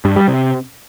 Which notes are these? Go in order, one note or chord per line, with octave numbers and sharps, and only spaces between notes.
G2
G3
C3